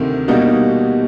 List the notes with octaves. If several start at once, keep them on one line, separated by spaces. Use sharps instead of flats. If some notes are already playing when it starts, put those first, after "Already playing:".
Already playing: D2 C3 D#3
B2 G3 A#3 D#4 F#4